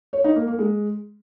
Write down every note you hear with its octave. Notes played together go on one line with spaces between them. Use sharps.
C#5
D#4
A#3
A#3
G#3